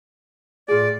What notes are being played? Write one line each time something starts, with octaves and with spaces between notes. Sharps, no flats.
A2 F4 G#4 D5